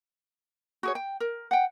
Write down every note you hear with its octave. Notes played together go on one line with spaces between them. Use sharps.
F#4 G#4 C#5
G5
A#4
F#5 G5